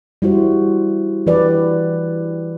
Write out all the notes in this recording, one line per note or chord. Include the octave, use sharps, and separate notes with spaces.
G3 E4 F#4 C5
E3 G4 B4 D5